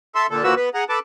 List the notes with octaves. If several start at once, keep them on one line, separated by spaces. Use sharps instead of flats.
A4 E5 C6
A#2 D3 A4
D#2 F3 A#3 F#4 B4 E6
B3 B4
G#4 F#5 A#5
A4 B4 A5 D6